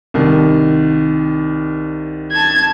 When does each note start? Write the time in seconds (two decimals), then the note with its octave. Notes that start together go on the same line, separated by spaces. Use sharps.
0.14 C2 D#3
2.32 A5 G#6